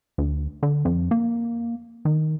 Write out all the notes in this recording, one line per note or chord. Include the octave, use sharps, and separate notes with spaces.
D2
D3
F2
A#3
D#3